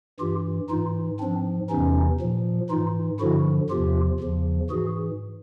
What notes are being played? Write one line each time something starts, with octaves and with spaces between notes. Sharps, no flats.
G2 E3 F4 G4
G#2 E3 D#4 F4
G#2 F3 C4 D4
E2 C3 E3 C#4 D#4
A#2 F3
G#2 E3 D#4 F4
G2 D3 F3 E4 F#4
E2 C3 F3 F4 G4
E2 C#3 F3
G#2 E3 F#4 G#4